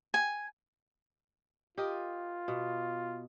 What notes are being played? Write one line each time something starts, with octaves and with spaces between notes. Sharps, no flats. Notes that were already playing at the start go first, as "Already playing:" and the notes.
G#5
F4 G4 A#4 D#5
B2